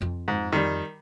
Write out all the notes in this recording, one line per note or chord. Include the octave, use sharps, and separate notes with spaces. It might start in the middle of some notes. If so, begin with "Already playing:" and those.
F2 F4
G#2
D#3 G3